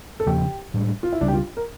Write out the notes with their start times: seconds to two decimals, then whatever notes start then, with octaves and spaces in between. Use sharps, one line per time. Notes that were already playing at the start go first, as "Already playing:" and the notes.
0.20 A4
0.26 E2 C#3 F3 A#3 G4
0.74 A2 G3 D4
1.03 F4
1.13 E4
1.21 C#2 C#3 G3 D4
1.28 G4
1.33 F4
1.57 A#4